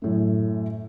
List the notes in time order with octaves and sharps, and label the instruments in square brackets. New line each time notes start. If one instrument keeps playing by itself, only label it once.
[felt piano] F#2 A2 A3